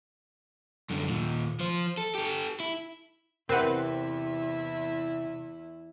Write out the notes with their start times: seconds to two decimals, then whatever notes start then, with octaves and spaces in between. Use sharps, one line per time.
0.90 F#2 D3
1.08 D#2 A#2
1.60 F3 C5
1.98 A4
2.15 G4 A4
2.60 E4
3.49 E2 C3 C4 E4 A#4 B4 F#5